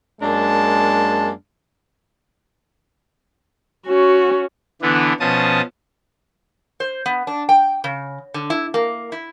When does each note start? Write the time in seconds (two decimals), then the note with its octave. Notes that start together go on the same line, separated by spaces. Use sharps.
0.22 F#2 G#3 A#3 D4 A5
3.87 C#4 F#4
4.82 D3 E3 B3 D4
5.20 B2 F3 C#4 A5 D#6
6.80 C5
7.06 B3
7.27 D4
7.49 G5
7.84 C#3
8.34 D3
8.50 E4
8.74 A#3
9.12 E4